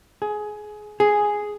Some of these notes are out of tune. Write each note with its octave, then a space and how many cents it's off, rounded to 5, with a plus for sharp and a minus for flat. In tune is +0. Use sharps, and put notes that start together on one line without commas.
G#4 +20
G#4 +0